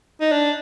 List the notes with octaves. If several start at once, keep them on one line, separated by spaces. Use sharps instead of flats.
D#4
D4